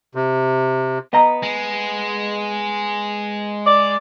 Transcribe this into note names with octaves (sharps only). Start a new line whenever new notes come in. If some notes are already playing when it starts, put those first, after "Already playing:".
C3
B3 D#5 A#5
G#3
D5